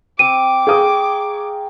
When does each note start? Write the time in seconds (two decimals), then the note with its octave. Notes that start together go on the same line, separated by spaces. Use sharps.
0.19 C4 D6 D#7
0.67 G#4 F5 G5 A#5 C#6 D#6